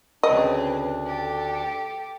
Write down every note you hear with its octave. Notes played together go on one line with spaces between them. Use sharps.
D2 C#3 C4 D4 B4 D#5
G4 A4